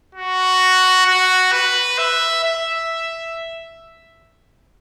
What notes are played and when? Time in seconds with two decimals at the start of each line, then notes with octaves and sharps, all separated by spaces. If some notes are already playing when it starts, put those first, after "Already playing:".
0.15 F#4
1.06 F#4
1.52 B4
1.98 E5
2.44 E5